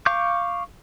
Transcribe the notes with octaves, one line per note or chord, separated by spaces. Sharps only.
F5 C#6 D6 G6